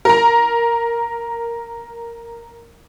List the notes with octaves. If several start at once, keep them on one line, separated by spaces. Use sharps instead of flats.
A#4 A#5